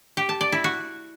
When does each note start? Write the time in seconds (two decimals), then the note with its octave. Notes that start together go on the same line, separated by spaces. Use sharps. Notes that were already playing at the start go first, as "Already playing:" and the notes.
0.17 G4
0.29 A5
0.41 D5
0.52 E4
0.64 F#4